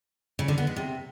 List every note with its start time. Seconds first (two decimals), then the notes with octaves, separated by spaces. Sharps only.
0.39 C#3
0.48 D3
0.58 B3
0.67 G#3
0.76 C3